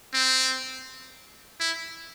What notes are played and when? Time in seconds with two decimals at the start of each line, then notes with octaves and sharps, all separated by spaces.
0.14 C4
1.60 E4